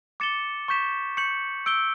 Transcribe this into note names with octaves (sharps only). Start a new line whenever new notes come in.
D6 A6 C#7 E7 G7
C#6 G6 B6 E7
C#6 G6 C#7 F#7
E6 G6 D7 G7